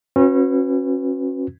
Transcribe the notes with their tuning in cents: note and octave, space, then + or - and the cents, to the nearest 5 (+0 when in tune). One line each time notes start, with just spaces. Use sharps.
C#4 -35 F#4 -25 B4 +0